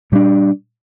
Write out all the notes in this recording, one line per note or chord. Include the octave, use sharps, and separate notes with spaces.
A#2 G3 D4